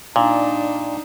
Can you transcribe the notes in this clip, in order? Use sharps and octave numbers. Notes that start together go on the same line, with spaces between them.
A#2 D4 D#4